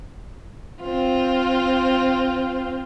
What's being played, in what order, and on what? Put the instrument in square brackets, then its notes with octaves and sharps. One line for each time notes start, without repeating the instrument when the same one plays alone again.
[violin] C4 F4